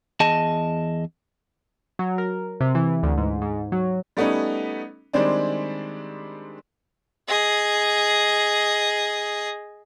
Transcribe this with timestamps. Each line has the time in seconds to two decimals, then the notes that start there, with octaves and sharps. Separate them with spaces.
0.20 E2 G#4 D#5 A5
1.99 F#3
2.18 A#4
2.61 C3
2.75 E3
3.03 D2
3.17 G#2
3.41 G#2
3.72 F#3
4.17 G3 A3 B3 C#4 D#4
5.13 D#3 G3 G#3 C4 D4
7.28 G#4 D#5